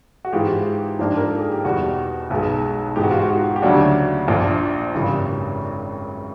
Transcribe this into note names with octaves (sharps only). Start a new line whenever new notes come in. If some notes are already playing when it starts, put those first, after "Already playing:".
F#4
G#2 E3 G#3 F4 G4
G#2 F3 A#3 D4
A#4
A4
G#4
G4
E2 B2 G3 F#4
B1 B2 G#3
G#2 E3 G#3 G4
F#4
F4
F#4
F#4
G4
D2 C#3 F#3 A#3 D4 F#4
A#1 A#2 F3 A#3 D4 F4
G#1 F#2 C#3 E3 G3